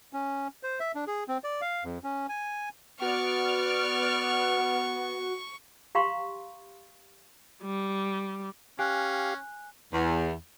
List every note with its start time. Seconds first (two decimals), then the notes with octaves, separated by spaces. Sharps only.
0.13 C#4
0.63 C5
0.80 E5
0.95 D4
1.07 G#4
1.28 C4
1.44 D5
1.61 F5
1.84 F2
2.04 C#4
2.29 G#5
3.02 B3 F#4 D5 F#5 C#6 F6
5.95 G4 F5 A#5 C6 C#6
7.62 G3
8.79 C#4 G4 F5 G#5 F#6
9.93 E2